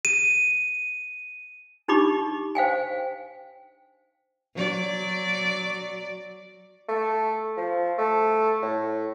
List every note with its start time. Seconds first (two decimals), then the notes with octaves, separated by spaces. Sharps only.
0.05 D#7
1.88 D4 D#4 G4 B5 C#6 D6
2.55 C5 F5 G5 G#5
4.55 F#3 D5
6.89 A3
7.57 F3
7.98 A3
8.62 A2